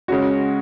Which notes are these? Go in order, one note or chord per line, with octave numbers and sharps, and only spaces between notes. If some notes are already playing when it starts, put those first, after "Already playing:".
C#3 G#3 C#4 F#4